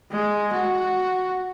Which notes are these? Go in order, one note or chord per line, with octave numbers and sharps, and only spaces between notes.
G#3
F#4